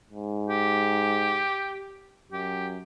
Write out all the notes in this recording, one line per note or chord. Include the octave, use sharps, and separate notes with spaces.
G#2
G4
F#2 G4